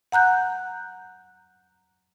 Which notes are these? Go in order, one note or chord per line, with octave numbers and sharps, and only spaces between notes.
F#5 A#5 F#6 G6